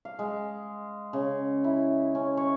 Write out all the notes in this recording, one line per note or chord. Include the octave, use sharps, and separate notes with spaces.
F5
G#3
C#3
E4
C#4
C#5